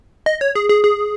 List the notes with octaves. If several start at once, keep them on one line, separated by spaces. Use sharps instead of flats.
D#5
C#5
G#4
G#4
G#4